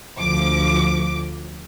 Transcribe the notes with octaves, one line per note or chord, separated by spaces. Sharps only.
D2 F3 D6